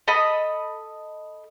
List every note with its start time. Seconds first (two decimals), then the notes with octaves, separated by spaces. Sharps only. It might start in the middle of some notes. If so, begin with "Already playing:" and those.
0.08 A4 D#5 B5 D#6